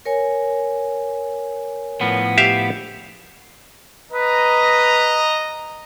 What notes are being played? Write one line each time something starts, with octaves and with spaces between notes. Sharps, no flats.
A#4 C#5 G#5
A2 F3 B3
G4 E5 F5
B4 D#5 A#5